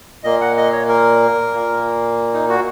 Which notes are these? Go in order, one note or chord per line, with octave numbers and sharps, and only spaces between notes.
A#2 A#3 D#5
F#5
D#5
C#5
A#4
A#2 A#3
D#4
F#4